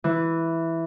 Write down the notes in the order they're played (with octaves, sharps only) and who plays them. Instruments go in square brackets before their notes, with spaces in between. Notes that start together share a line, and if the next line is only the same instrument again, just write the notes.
[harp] E3